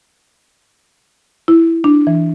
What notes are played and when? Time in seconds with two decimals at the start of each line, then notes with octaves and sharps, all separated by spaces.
1.48 E4
1.84 D4
2.07 E3